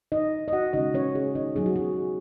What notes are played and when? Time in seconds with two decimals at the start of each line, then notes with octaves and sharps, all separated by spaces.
0.12 D#4 D#5
0.48 D#5
0.53 F#4 F#5
0.73 C#3 G#3 C#4 D#4 D#5
0.94 C#4 C#5
1.15 G#4
1.35 D#4 D#5
1.56 F#3 B3 D#4 G#4
1.66 F#4
1.76 G#4